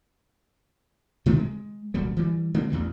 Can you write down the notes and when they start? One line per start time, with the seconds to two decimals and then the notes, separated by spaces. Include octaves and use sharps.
1.26 B2 D#3 A3 C4
1.40 G#3
1.94 D#1 C2 F#3 G3
2.16 E3 G3
2.54 D3 G#3 A#3 C4
2.70 A1 E2 G2 B2